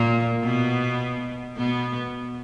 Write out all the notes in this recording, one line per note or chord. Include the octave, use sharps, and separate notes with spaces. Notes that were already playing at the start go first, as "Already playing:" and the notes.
Already playing: A#2 A#3
B2 B3
B2 B3